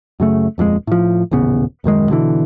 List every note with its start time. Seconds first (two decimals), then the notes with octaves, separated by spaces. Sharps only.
0.20 F#2 C#3 A3
0.58 D#1 F2 E3 G#3
0.87 A2 F3
1.31 D#1 A1 C#3 B3
1.84 D#1 F#2 D#3 G#3
2.10 B2 D3 E3